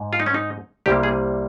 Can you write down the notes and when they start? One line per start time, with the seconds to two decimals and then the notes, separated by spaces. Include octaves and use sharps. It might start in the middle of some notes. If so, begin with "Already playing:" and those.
Already playing: G#2
0.13 F4
0.20 D#4
0.26 C#4
0.34 D#4
0.86 C2 C3 G3 A#3 G4
1.03 G#4